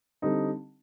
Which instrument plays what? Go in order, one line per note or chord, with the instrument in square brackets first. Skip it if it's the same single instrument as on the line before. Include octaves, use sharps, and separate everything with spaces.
[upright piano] D3 G3 C4 D#4